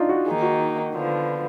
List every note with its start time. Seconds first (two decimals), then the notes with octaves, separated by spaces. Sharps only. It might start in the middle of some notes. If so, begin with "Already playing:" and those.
Already playing: D4 D#4 F4
0.09 F#4
0.26 D#3 A#3 D#4 G#4
0.42 F#4
0.92 D3 F3 B3